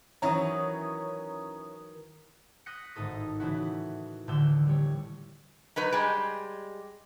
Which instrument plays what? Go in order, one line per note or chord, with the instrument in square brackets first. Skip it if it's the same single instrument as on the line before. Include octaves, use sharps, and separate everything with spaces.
[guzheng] D#3 E3 F#3 [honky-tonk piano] C#4 E4 C#5 [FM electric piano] A#5 D#6
[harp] D#6 F#6 G6 A#6 B6 C#7
G#1 A2 D#4 A4 D#6
C#3 E3 A3 C#4 E4 F#4
D#1 A1 D3 E6 G6 E7
G3 C#5
[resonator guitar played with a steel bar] F#3 D#4 B4
G3 G#3